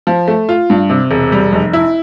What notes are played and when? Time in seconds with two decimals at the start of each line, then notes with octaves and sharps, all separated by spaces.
0.07 F3
0.28 A3
0.49 F4
0.70 G2
0.90 C3
1.11 E1
1.32 G3
1.53 F1
1.73 E4